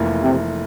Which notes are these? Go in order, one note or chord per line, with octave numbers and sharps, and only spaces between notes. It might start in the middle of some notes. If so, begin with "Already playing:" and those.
Already playing: F1 F2 E3 A#3 E4
C3